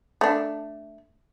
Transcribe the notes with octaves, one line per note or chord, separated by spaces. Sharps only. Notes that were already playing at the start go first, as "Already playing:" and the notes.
A3 D4